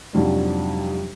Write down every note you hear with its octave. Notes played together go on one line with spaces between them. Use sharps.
F2 G#2 C3 F#3 G3 D4